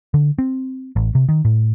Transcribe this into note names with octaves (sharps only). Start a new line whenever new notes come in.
D3
C4
A1
C3
D#3
A2